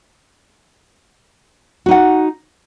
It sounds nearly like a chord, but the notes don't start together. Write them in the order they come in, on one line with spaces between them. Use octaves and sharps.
F#4 D#4 F#5